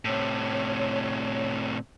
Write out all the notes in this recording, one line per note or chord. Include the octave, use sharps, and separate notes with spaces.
A2 C3 C#5